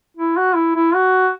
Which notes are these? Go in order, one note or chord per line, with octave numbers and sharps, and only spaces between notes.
E4
F#4
E4
E4
F#4